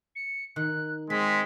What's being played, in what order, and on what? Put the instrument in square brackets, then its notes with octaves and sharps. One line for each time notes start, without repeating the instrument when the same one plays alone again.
[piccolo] C#7
[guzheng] D#3 [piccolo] F#6
[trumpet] G#3 [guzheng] C4 [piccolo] B6